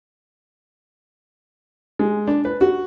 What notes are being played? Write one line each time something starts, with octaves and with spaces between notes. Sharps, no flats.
G#3
D4
B4
F#4